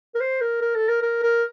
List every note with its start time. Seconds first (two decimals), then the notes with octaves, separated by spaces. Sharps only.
0.15 A#4
0.21 C5
0.41 A#4
0.61 A#4
0.75 A4
0.89 A#4
1.02 A#4
1.23 A#4